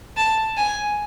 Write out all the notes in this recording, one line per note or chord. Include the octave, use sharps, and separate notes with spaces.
A5
G#5